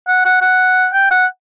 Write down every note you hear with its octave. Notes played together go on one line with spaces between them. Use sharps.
F#5
F#5
F#5
G5
F#5